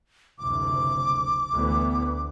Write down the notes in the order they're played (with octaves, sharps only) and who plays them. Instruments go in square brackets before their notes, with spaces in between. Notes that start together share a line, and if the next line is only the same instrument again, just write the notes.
[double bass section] F#1 D2 C3 [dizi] D6
[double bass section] D2 E3 B3